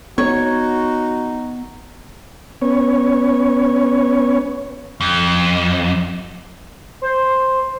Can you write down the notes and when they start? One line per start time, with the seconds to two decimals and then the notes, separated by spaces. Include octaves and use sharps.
0.18 B3 D#4 F#4 C#5
2.62 B3 C#4 C#5
5.01 F2
7.02 C5